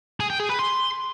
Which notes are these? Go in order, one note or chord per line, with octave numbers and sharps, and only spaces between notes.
G#4
G5
G#4
B4
C6